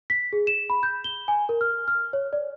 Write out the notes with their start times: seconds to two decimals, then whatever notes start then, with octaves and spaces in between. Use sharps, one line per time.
0.10 B6
0.33 G#4
0.47 E7
0.70 B5
0.83 G6
1.04 G7
1.28 G#5
1.49 A#4
1.61 F6
1.88 F6
2.13 C#5
2.33 D5